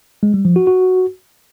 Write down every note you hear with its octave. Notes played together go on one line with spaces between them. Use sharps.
G#3
G3
F3
F#4
F#4